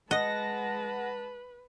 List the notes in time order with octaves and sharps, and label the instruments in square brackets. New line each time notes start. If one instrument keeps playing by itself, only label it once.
[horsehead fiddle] G#3 A5 [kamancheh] B4 [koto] D#5 [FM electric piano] F#5 A#6